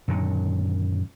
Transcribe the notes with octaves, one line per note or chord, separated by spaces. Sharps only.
F#2 A#2 D3 D#3